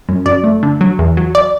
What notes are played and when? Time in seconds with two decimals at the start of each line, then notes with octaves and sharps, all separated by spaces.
0.09 F#2
0.26 F#2 D5
0.44 A3
0.63 D3
0.81 F#3
0.99 E2
1.17 F#3
1.35 D5